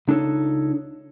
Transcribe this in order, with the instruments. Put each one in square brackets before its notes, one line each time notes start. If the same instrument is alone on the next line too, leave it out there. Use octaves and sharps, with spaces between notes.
[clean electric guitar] C#2 D4 D#4 A4 C#5